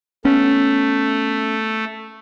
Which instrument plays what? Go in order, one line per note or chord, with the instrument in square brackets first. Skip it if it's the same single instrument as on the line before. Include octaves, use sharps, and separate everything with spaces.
[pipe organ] A3 [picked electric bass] B3 C#4